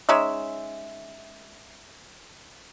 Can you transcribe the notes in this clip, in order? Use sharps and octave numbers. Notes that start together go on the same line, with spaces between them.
G#3 C#4 D#4 E5